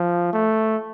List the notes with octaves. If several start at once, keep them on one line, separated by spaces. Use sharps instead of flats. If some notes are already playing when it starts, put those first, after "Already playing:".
Already playing: F3
A3